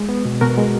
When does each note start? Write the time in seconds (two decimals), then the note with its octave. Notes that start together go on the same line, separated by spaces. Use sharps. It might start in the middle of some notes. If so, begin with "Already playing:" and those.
Already playing: G#3
0.09 B3
0.25 B2
0.41 B2 F#4 A#4
0.58 G#3